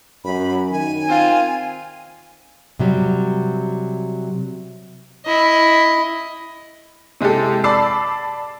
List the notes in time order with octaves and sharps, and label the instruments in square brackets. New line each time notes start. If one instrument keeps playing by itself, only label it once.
[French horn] F#2 [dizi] B5
[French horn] D#3 [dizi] G#5
[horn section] C4 F4
[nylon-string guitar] C3 F#3 G3
[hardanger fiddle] E4 D#5
[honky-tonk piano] C3 G#3 E4 G4 A4
D5 A5 B5 D6 E6 C7